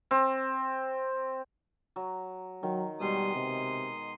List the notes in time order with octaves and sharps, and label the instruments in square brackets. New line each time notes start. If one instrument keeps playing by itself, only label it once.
[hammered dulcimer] C4
F#3
[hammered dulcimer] D#3 [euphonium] F#3
[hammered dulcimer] B2 G#3 [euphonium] G3 [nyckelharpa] C6 D#6
[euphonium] C3